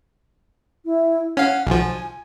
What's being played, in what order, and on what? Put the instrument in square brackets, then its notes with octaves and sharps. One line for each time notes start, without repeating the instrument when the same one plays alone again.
[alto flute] E4
[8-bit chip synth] C#4 F5 [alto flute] F#5
[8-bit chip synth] B1 F3 [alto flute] G#5